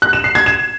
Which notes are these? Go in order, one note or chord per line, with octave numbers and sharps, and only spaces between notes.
F#6
E7
C7
G#6
E7